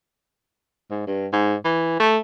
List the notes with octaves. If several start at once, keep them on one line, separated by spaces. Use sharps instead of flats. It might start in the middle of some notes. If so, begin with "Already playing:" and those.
G#2
G2
G#2
E3
A3